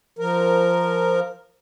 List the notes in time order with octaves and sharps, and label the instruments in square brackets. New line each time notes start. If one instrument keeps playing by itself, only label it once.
[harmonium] F3 A#4